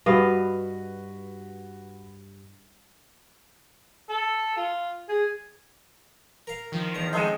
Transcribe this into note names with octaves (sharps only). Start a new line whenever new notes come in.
G2 F#4 B4 D#5 F5
A4
F4
G#4
A#4 F5
D#3 F3
E2 A#5
G#3 C4 C#4 A4 C5 D#5